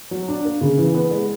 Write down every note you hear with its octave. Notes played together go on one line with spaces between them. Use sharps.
F#3
D4
A#3
C#3
E3
B3
G#3